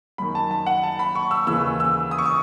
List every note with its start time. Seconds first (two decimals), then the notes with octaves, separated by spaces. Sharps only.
0.18 F#2 D#3 B5
0.35 A5
0.51 A5
0.66 F#5
0.83 A5
0.99 B5
1.15 C#6
1.31 E6
1.47 D#2 C#3 E3 E6
1.80 E6
2.11 D#6
2.18 C#6
2.26 D#6